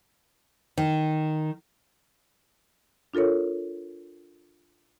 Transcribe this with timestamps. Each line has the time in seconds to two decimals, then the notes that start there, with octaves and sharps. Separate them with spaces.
0.78 D#3
3.13 D4 F4 A4 A#4 C#5